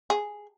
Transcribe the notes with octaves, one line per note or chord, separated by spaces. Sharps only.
G#4